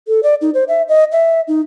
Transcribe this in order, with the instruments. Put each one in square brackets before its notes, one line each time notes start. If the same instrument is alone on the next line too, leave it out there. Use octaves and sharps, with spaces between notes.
[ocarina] A4
D5
D#4
C5
E5
D#5
E5
D#4